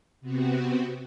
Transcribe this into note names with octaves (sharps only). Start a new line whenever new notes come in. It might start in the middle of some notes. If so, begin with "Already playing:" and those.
C3 B3 C4 F#4